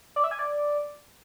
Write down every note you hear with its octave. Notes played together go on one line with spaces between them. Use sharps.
D5
E5
G#5
D5